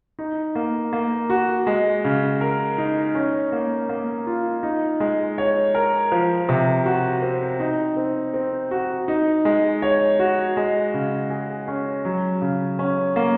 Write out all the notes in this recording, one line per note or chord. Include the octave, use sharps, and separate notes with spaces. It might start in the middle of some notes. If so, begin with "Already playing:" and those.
D#4
A#3
A#3
F#4
G#3
C#3
A#4
D#4
C#4
A#3
A#3
F4
D#4
G#3
C#5
A#4
F3
C3
F#4
C4
D#4
C4
C4
F#4
D#4
G#3
C#5
F#4
G#3
C#3
G#4
C#4
F#3
C#3
C#4
A#3